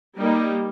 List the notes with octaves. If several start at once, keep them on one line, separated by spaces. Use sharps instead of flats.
G3 A#3 D#4